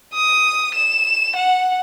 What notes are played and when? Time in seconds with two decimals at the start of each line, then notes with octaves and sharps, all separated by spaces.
0.14 D#6
0.75 E7
1.36 F#5